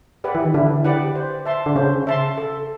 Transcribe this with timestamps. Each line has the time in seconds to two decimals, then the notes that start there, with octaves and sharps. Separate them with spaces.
0.24 G4 B4 D5 F#5
0.35 E3
0.44 D#3
0.54 D3 E4
0.84 G4 B4 D5 F#5
1.16 C5
1.46 E5 A5 C6
1.66 D3
1.76 C#3 C5
2.07 E5 A5 C6
2.37 A4